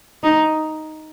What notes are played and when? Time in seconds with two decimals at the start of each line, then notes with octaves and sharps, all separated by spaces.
0.23 D#4